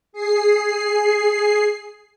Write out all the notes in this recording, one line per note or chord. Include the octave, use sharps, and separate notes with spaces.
G#4 C7